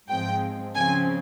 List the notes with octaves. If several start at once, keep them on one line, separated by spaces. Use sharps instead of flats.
G#2 F3 G#3 C4 G5
C#3 F3 C4 G#5